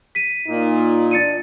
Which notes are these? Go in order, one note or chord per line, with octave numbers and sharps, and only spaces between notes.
B6 D#7
A#2 D#4
D4 A6 C#7 D#7